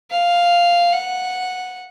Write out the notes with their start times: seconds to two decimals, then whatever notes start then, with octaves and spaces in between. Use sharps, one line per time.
0.10 F5
0.92 F#5